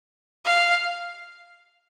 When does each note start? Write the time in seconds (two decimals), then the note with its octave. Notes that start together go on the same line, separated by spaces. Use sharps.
0.46 F5